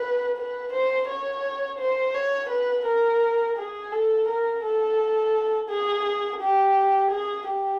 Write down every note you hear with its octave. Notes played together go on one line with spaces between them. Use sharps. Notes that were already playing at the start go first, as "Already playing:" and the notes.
Already playing: B4
B4
C5
C#5
C5
C#5
B4
A#4
G#4
A4
A#4
A4
G#4
G4
G#4
G4